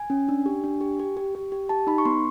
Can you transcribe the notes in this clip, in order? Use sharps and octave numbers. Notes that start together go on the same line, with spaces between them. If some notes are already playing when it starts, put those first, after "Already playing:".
Already playing: G#5
C#4
D4
G4
D4
G4
G4
G4
G4
G4
G4 A5
D#4 B5
C#6
B3 C6